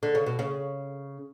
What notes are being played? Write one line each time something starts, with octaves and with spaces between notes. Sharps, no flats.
D3
C#3
B2
C#3